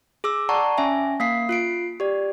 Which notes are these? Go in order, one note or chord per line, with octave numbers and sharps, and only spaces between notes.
G#4 D6 E6
D5 F#5 A5 A#5 C#6
C#4 E5 G#5
A#3 F5 B6 C7
F4 C7 D7
G4 D5